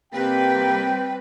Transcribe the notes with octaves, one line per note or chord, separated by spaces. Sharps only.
C3 G3 A#3 C4 G4 B4 G5